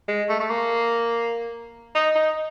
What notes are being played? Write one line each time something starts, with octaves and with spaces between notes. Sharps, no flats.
G#3
A3
A3
A#3
D#4
D#4